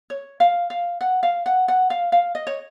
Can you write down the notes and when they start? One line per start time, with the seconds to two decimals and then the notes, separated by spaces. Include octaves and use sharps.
0.10 C#5
0.40 F5
0.70 F5
1.01 F#5
1.23 F5
1.46 F#5
1.68 F#5
1.90 F5
2.12 F5
2.35 D#5
2.47 C#5